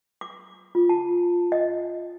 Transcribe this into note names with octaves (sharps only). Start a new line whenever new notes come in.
D6
F4
A5
D#5